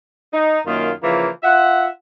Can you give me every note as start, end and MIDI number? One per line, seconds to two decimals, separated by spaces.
0.32 0.59 63
0.65 0.90 42
0.65 0.90 51
0.65 0.90 58
0.65 0.90 65
1.02 1.27 49
1.02 1.27 52
1.02 1.27 53
1.02 1.27 58
1.43 1.86 65
1.43 1.86 76
1.43 1.86 78